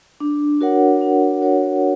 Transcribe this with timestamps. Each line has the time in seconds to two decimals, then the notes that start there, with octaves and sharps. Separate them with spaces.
0.20 D4
0.61 F#4 A#4 C#5 F#5
1.01 D4
1.41 F#4 A#4 C#5 F#5